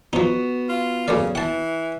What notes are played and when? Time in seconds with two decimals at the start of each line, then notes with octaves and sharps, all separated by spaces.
0.13 F3 B3 D#4 F#4
0.69 F4
1.08 F#2 C#3 A3 D5
1.35 E3 F#5 A5